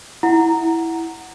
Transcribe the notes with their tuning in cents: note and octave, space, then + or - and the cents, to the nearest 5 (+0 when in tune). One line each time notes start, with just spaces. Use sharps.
E4 +0 F#5 +0 A#5 +0